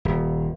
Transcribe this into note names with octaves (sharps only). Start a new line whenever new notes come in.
D#1